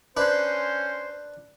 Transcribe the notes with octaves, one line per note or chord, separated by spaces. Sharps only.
C#4 D4 B4 C5